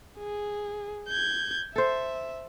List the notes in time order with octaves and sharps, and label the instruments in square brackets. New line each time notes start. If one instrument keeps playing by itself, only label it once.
[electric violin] G#4
G6 G#6
[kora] A4 C5 [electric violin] E5